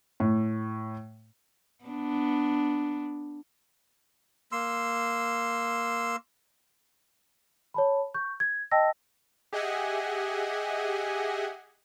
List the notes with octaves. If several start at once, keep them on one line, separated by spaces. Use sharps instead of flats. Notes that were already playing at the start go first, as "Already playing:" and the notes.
A2
B3 D4
A#3 C6 E6
C#5 A5 B5
C#6 G6
G#6
D#5 G5 A5 E6 A#6
G4 G#4 D#5 E5 F#5 G#5